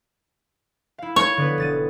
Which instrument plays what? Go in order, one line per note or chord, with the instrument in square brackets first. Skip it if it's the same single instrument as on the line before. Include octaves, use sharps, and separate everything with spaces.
[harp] E4 F5
[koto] C#5
[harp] D3 B3 B4
E1 A6 D#7